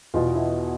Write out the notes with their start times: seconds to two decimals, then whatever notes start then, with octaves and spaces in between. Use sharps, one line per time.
0.14 E2 B2 F4
0.35 E4